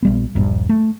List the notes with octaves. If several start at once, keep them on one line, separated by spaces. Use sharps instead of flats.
A#1 G3 B3
D#1 A#1 G2
A3